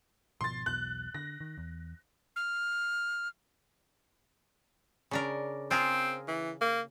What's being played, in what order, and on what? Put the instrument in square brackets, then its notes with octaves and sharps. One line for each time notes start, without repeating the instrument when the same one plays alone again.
[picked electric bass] G#1 B2 F3 [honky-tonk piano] C6 A6
[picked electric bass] B1 E2 B2 [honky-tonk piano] F#6
[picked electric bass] D3 [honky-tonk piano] A#6
[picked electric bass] D#3
E2
[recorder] F6
[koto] C#3 D4 A#4
[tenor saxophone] C4 [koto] F4 G#4 A#4
[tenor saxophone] E3
A#3